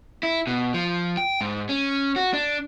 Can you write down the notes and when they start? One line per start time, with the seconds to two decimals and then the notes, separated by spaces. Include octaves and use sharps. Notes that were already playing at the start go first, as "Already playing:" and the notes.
0.23 E4
0.47 B2
0.74 F3
1.17 G5
1.41 G#2
1.69 C#4
2.16 F#4
2.33 D4